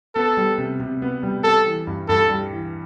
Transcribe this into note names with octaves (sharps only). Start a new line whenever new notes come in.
B3 A4
G3
C3
C3
B3
G3
G3 A4
E3
G2
G2 A4
G3
E3